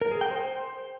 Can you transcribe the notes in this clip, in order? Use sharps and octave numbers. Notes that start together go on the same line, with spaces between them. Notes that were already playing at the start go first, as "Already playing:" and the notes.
A#4
G#4
G5
C5